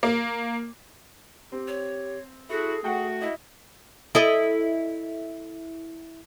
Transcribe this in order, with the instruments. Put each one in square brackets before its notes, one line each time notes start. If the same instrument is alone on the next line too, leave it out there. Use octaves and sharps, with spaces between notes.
[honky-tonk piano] A#3
[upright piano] C4 [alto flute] G4
[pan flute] C#5
[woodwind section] E4 F#4 [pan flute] G#4 [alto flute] A4
[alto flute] A3 [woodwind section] F#4 [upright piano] F#5 G5
[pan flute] E4 [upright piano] D#5 E5
[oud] E4 A4 D#5